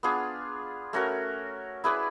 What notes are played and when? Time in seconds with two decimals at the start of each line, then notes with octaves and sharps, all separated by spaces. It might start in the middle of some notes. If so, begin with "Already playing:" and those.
0.03 B3 D4 F4 G#4
0.93 A3 C#4 F#4 A#4
1.84 E4 G#4 B4 D5